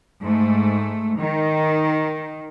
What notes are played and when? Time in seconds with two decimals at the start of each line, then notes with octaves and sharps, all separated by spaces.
0.23 G#2 A3
1.19 D#3